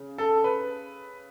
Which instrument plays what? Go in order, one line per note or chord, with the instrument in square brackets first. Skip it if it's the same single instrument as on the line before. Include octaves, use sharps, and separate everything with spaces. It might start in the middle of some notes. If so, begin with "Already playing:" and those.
Already playing: [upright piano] C#3
A4
B4